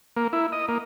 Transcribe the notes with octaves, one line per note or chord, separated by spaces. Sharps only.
A#3
E4
D#5
A#3